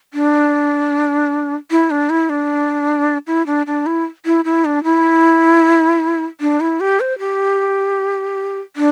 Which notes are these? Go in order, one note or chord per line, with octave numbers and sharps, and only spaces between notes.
D4
E4
D4
E4
D4
E4
D4
D4
E4
E4
E4
D4
E4
D4
E4
G4
C5
G4
D4